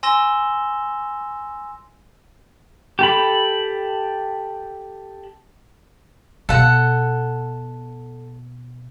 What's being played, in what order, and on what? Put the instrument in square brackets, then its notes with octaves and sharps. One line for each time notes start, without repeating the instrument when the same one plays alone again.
[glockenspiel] G#5 C6 E6 A#6 E7 G7
[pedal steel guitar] G4 A4 B5
[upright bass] B2 [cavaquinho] A4 F#5